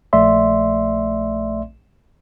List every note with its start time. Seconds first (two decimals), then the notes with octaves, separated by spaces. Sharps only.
0.13 A#1 A3 D5 E5 C6